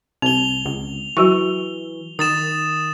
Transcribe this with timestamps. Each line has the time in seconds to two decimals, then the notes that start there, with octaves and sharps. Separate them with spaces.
0.22 C2 C4 F7 G7
0.66 C#2
1.17 E3 F#3 F#4 C#6
2.19 D#3 D#6 A6 E7